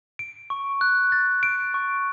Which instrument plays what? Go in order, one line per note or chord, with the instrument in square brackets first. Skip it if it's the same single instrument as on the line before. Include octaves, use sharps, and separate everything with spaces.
[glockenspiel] D7
C#6
F#6
A6
D7
C#6